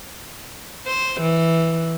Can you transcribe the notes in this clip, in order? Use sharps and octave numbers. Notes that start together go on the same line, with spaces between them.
C5
E3